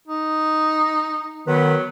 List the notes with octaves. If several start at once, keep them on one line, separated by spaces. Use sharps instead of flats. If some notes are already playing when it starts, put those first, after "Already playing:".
D#4
D#3 F#3 B3 B4